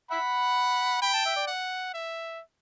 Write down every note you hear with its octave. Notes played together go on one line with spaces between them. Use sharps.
E5 F#5 B5
G5 B5
A5
E5
D5
F#5
E5